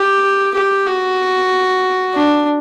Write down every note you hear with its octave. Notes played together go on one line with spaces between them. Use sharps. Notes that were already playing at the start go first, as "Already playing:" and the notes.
Already playing: G4
G4
F#4
D4